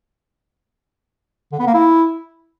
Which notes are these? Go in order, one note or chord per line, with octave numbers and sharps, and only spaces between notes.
D3
B3
A#3
E4